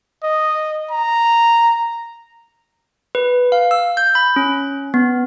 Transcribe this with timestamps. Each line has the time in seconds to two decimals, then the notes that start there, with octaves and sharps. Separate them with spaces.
0.23 D#5
0.91 A#5
3.15 B4
3.52 F5
3.71 E6
3.97 G6
4.15 B5
4.36 C#4
4.94 B3